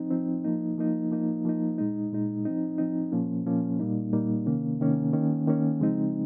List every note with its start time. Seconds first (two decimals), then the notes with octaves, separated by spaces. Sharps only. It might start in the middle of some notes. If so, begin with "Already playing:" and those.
Already playing: F3 C4 D#4
0.11 F3 C4 D#4
0.44 F3 A#3 D#4
0.78 F3 A#3 D#4
1.11 F3 A#3 D#4
1.45 F3 A#3 D#4
1.78 A#2 G#3 D#4
2.12 A#2 G#3 D#4
2.45 F3 C4 D#4
2.78 F3 C4 D#4
3.12 A#2 F3 A#3 C#4
3.45 A#2 F3 A#3 C#4
3.79 A#2 G3 A#3 D#4
4.13 A#2 G3 A#3 D#4
4.46 C3 D#3 A#3 C#4
4.80 C3 D#3 A#3 C#4
5.13 D#3 A#3 C#4
5.47 D#3 A#3 C#4
5.81 C#3 F3 G#3 C4 D#4